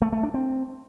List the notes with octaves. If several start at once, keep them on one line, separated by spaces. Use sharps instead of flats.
A3
A3
D4
C4